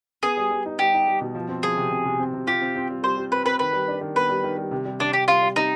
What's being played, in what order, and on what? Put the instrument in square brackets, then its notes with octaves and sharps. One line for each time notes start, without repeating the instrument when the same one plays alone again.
[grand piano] B3 [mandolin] G#4
[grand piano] G3
G3
D#4
[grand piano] G3 [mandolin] G4
[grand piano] D#4
G3
B2
F3
C4
[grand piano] F3 [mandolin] G#4
[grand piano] C3
C3
C3
C4
C3
[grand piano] F4 [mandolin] G4
[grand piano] C4
C4
G3
[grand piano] G3 [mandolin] C5
[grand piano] G3
[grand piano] C4 [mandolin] B4
[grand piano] C4 [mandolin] B4
[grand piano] D#3 [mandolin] B4
[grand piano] G3
D4
D#3
[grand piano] B3 [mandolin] B4
[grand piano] G3
D#3
G3
C3
G3
[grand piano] C3 [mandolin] D4
[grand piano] G3 [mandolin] G4
[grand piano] G3 [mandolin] F4
[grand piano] G3
[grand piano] C3 [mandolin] D#4